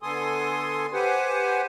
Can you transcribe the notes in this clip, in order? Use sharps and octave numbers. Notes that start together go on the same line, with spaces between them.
D3 B3 A4 G#5 C6 D#6
G4 B4 C5 F#5 G#5